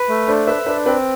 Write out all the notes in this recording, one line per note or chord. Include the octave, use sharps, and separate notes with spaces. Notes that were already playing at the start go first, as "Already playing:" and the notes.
Already playing: B4
A3
D4 A4 C5
B4 E5
D4 B4
C4 B4